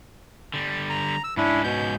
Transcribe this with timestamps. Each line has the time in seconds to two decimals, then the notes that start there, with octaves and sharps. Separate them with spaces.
0.54 D3 G3
0.90 A#5
1.24 E6
1.37 G#2 C#4 D4 E4
1.64 B2 G6